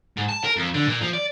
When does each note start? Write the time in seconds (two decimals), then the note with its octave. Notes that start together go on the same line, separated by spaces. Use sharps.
0.17 G#2
0.29 A5
0.45 A#4
0.57 F2
0.74 D3
0.87 A#2
1.01 F3
1.13 D5